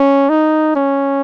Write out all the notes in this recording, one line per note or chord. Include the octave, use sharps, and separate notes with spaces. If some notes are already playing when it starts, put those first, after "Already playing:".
Already playing: C#4
D#4
C#4